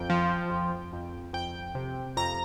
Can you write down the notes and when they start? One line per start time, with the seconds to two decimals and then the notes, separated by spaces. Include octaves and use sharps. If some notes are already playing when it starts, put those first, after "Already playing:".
Already playing: F2 G5
0.10 F3
0.50 F2
0.93 F2
1.33 F2 G5
1.75 C3
2.17 F2 A#5